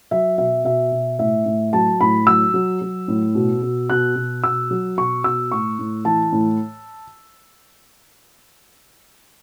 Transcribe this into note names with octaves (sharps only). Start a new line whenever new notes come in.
F#3 E5
B2 E5
B2 E5
B2
A2 E5
A2
F#3 A5
A2 B5
F#3 E6
F#3
F#3
A2
B2
B2
B2 F#6
B2
B2 E6
F#3
B2 C#6
B2 E6
A2 C#6
A2
E3 A5
A2